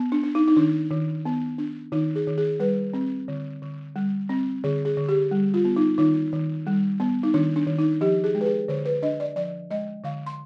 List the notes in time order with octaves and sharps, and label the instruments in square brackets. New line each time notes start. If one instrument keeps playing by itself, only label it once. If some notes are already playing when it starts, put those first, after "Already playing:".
Already playing: [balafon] B3
D4
D4
D#4
D#4
D#3 D4
D#3
B3
D4
D#3 D#4
G#4
D#3
G#4
G3 B4
C4
D3
D3
G3
C4
D3 G#4
G#4
D3
G4
G3
F4
B3
D#4
D#3 D#4
D#3
G3
B3
D#4
D#3 D4
D4
D#3
D#4
F3 G4
G#4
G#3
B4
G#4
D3 C5
B4
D4 D#5
D5
F3 D5
G#3 D#5
D3 F5
C6